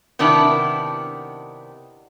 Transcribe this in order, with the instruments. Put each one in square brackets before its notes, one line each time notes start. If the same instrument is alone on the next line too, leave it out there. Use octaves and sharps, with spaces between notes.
[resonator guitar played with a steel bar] C3 D#3 B3 D4 E4